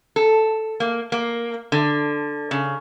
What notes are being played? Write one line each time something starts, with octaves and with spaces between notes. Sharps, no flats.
A4
A#3
A#3
D3
C#3